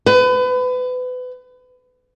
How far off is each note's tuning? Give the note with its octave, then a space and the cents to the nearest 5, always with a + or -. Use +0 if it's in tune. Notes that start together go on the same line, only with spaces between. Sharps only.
B4 +30